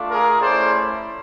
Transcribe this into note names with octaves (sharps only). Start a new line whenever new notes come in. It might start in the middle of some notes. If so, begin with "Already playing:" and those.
Already playing: A3 D4 F4
G#4 A#4
A3 C#4 E4 C5 D5